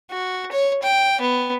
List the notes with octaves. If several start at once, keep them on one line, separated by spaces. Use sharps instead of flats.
F#4
C#5
G5
B3